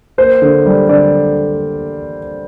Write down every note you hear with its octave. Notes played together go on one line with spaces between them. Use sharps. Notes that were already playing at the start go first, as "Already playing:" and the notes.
A#3 C5
D3
G3
D3 D5